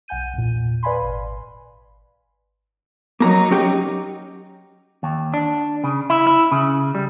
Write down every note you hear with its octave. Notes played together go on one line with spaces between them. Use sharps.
B1 F#5 G#5 G6 D#7
E2 A#2
B4 D5 F5 G#5 B5 C6
G#1
F#3 A#3 D#4 A#5
C#4 G4
D#2
D4
C#3
E4
E4
C#3
G3